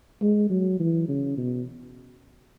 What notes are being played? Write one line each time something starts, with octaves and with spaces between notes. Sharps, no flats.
G#3
F#3
E3
C#3
B2